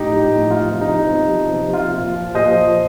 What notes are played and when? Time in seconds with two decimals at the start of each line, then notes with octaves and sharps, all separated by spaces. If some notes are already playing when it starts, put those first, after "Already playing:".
Already playing: A2 D#4 G4
0.10 F3
0.30 A2
0.50 F3 F4
0.71 C3
0.81 D#4
0.91 F3
1.13 C3
1.33 F3
1.53 C3
1.73 F3 F4
1.94 A#2
2.15 F3
2.35 A#2 C5 D#5
2.56 F3